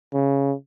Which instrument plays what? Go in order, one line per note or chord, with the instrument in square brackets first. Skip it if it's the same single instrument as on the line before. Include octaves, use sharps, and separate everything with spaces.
[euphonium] C#3